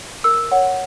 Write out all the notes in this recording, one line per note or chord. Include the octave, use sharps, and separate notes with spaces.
A#4 E6
C#5 F#5